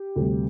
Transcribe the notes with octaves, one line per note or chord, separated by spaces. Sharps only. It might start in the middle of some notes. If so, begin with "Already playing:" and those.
Already playing: G4
D2 C3 G3